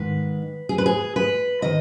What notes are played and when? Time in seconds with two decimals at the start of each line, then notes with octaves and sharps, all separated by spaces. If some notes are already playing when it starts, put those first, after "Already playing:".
Already playing: G#2 D#3 B4
0.69 G#4
0.78 B4
0.86 G#4
1.16 B4
1.62 D#3 D#5